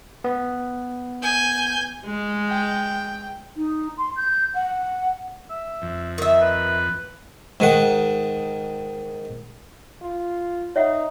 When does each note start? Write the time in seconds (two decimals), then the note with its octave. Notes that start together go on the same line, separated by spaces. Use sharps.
0.24 B3
1.22 G#5 G6
2.06 G#3
2.50 G5
3.56 D#4
3.97 C6
4.16 G6
4.54 F#5
5.50 E5
5.82 F2
6.18 D#3 E5
6.42 B4
7.60 G#2 D#3 F#5
10.02 F4
10.76 D#4 C#5 E5 F#5